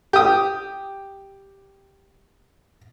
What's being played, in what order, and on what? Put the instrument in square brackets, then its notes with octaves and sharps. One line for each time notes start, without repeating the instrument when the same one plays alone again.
[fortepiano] G4 D#6